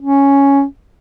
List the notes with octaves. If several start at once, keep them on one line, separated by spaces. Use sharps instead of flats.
C#4